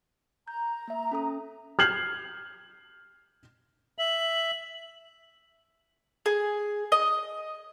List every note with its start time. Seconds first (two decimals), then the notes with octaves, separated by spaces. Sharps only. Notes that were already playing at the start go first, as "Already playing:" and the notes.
0.48 A#5 G6
0.88 A#3 E5
1.12 C#4 A4 D#6
1.79 F6 G6 G#6 C7 F#7
3.99 E5 F#7
6.26 G#4
6.92 D#5